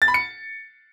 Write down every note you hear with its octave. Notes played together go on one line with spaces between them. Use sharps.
A6
B5
C#7